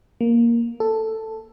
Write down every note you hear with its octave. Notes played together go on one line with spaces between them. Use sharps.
A#3
A4